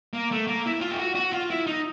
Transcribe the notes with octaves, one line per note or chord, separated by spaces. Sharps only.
A#3
A3
A#3
E4
F4
G4
F#4
F#4
F4
E4
D#4